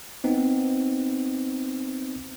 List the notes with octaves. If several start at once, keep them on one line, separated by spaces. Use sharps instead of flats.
B3 C4 D#4